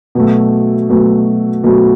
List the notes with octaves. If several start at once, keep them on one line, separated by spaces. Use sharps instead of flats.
B2 F#3 A3
B2 F#3 A3
B2 F#3 A3